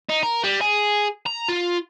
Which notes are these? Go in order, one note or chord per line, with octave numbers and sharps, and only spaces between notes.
D#4
A#4
G3
G#4
A#5
F4